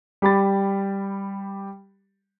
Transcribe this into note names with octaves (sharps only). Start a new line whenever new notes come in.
G3 G4 B5 A6